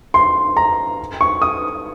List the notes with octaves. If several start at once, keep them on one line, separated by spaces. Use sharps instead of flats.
C6
A#5
C#6
D#6